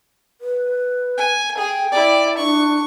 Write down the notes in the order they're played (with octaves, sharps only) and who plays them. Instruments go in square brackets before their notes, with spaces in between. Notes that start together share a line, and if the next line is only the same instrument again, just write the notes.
[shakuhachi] B4
[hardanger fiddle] G#5
[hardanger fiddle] G#4 [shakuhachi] G5
[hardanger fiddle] E4 D5
[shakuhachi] D4 [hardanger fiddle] C#6